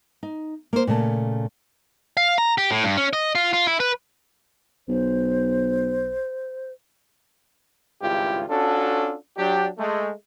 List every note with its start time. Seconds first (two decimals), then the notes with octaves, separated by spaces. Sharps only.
0.23 D#4
0.73 A#3 C5
0.87 A#2 C#3 A3 A5
2.17 F5
2.38 A#5
2.58 G4
2.71 A2
2.84 G2
2.97 C#4
3.13 D#5
3.35 F4
3.53 F4
3.67 E4
3.80 B4
4.88 B1 C5
8.02 G#1 C#2 G2 E4 F4 G4
8.49 C#4 D4 F4 F#4 A4
9.37 F#3 D4 G4
9.78 G#3 A3